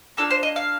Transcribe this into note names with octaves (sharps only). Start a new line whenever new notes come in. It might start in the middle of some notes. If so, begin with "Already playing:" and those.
A#3 D4 F4 A4
C5
D#5
F5